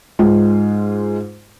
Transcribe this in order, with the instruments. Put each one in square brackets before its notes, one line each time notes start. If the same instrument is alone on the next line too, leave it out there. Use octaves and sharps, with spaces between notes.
[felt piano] G#2 G#3 F4